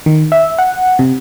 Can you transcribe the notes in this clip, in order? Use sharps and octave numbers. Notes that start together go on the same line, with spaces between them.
D#3
E5
F#5
C3